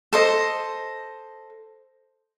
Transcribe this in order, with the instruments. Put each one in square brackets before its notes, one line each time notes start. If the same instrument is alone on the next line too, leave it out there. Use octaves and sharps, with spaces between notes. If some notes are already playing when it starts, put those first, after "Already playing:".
[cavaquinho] A4 C5 D#5